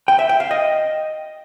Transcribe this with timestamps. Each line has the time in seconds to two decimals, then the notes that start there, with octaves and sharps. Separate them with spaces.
0.08 G5
0.19 E5
0.29 G5
0.40 F5
0.51 D#5